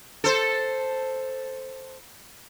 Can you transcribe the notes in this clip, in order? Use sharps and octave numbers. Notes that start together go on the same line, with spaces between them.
A4 C5